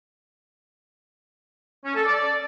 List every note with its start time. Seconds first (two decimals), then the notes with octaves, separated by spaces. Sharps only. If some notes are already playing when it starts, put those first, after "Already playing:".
1.85 C#4
1.95 A4
2.05 D5